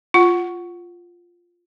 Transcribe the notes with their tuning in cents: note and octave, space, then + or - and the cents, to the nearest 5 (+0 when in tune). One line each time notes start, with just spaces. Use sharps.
F4 +0 F#5 +5